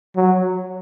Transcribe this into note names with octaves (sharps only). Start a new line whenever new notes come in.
F#3